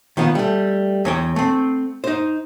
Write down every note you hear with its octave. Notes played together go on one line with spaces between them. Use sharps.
D#3 F3 B3
G3 A3
E2 C#5 G5
A3 C4
D#4 C5